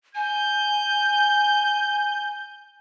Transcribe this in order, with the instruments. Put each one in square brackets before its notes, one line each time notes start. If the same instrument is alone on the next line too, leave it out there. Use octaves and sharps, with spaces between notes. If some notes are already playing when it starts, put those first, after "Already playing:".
[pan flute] G#5 [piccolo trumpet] G6